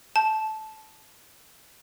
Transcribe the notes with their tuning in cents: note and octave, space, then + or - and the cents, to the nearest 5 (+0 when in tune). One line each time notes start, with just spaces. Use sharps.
A5 -15